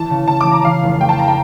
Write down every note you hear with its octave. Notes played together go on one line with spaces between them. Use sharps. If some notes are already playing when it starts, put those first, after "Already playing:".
Already playing: E3 A5
C#3
C#3 A5
D6
E3
A#5
E3 F5
F1
A3 G5
A5
A#5
G5